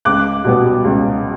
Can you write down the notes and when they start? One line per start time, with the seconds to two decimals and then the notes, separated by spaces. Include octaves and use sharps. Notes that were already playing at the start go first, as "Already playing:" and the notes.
0.05 C#2 D6 F#6
0.45 B2 G3 B3
0.84 C#2